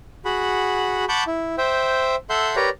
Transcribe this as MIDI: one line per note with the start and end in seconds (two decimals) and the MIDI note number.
0.25 1.05 66
0.25 1.05 68
0.25 1.05 78
0.25 1.05 83
1.09 1.24 78
1.09 1.24 81
1.09 1.24 83
1.09 1.24 85
1.09 1.24 86
1.09 1.24 91
1.27 1.56 64
1.58 2.16 72
1.58 2.16 76
1.58 2.16 79
2.30 2.56 69
2.30 2.56 76
2.30 2.56 78
2.30 2.56 84
2.30 2.56 91
2.56 2.70 67
2.56 2.70 70
2.56 2.70 71
2.56 2.70 73
2.56 2.70 74
2.56 2.70 82